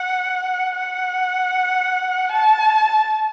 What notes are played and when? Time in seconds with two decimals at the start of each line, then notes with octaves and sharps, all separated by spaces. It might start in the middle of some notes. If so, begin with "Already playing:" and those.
Already playing: F#5
0.78 F#5
2.32 A5